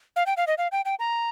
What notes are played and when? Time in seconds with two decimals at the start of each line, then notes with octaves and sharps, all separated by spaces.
0.16 F5
0.26 G5
0.37 F5
0.47 D#5
0.58 F5
0.72 G5
0.85 G5
0.99 A#5